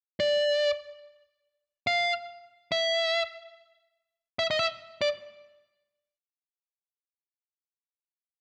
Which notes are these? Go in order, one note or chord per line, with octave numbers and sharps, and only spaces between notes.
D5
F5
E5
E5
D#5
E5
D5